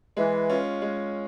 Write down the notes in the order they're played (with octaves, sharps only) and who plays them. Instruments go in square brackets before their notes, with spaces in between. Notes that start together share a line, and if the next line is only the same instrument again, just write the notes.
[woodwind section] E3 [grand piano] G#3
[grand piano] C#4 F4
G#3